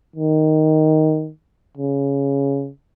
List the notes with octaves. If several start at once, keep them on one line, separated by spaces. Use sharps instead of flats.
D#3
C#3